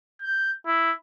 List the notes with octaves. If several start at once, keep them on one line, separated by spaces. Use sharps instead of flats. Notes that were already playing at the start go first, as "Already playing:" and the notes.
G6
E4